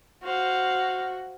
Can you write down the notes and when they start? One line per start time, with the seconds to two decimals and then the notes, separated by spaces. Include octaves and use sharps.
0.24 F#4 C5 F5